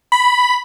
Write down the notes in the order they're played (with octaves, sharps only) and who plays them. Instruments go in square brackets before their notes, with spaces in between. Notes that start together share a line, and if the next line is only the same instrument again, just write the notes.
[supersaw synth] B5